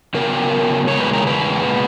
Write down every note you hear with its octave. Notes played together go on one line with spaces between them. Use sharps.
C#3 F#3 B3 A#4
E2 C#3 G#3 C#5
B4
A#4
B4
A#2 G#3 B3